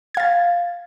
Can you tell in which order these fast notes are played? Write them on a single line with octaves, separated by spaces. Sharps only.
G#6 F5 A6